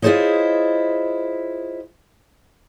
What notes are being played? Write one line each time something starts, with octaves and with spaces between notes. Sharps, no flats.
E4 F4 G#4 C5 C#5 D#5